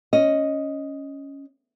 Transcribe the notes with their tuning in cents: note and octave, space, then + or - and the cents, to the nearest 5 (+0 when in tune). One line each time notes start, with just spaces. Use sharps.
C#4 +0 D#5 +0